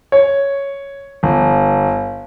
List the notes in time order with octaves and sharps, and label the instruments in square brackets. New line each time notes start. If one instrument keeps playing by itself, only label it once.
[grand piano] C#5
G1